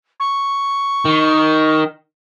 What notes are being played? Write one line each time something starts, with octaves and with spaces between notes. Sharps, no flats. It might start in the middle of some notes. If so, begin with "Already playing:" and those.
C#6
D#3